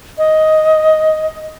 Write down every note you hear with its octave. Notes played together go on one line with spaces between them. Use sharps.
D#5